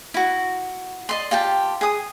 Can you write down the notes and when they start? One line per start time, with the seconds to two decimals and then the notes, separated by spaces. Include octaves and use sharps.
0.14 E4 F#4
1.09 D5 D#5 C6
1.31 F4 G4 G5 A5
1.81 G#4 D#6